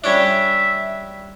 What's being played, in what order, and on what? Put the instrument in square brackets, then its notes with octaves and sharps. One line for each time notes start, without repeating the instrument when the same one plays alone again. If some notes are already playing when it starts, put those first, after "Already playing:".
[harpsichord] G3 C#4 D4 [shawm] E5